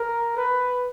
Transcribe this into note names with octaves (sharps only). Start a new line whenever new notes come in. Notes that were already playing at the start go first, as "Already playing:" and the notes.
Already playing: A#4
B4